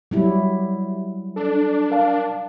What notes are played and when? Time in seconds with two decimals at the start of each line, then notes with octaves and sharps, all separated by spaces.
0.11 F#3 G3 E4
1.36 D4 A4
1.90 A#4 F5 A5